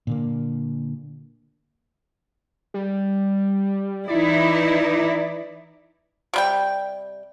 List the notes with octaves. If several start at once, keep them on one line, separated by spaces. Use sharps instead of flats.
A#2 D3 A#3
G3
E3 D#4 E4 D5
C3 G3 G5